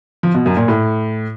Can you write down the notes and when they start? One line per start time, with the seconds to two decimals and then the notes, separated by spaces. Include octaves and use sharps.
0.23 F3
0.34 B2
0.46 F#2
0.57 A#2
0.68 A2